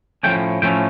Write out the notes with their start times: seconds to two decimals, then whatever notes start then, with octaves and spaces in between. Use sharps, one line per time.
0.23 A2 F3 A3 C#4 G5
0.62 A2 F3 A3 C#4 G5